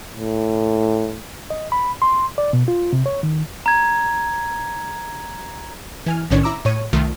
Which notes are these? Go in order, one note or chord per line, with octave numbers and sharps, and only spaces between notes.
A2
D#5
B5
C6
D5
B2
F4
C3
C#5
D#3
A#5 G#6
E3 G#5 F6
B1 A2 D#3 C#4 D4 C#5
E4 A#5 D6 E6
A2 C#5 D#7
C2 D#3 A3 F4